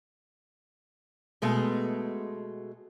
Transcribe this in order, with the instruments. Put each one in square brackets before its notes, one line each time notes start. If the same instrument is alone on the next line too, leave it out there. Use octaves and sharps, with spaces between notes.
[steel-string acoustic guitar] B2 G#3 A3